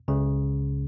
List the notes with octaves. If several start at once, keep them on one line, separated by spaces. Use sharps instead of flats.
C#2 C#3